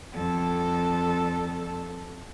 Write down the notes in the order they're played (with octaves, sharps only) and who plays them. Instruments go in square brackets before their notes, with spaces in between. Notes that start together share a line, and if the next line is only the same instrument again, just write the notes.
[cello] F2 A4